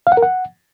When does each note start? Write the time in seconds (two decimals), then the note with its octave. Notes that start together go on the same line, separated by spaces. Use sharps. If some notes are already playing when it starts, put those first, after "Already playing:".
0.07 F5
0.12 F#5
0.17 A#4
0.23 F#5